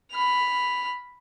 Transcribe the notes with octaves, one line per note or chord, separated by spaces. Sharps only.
B5 F6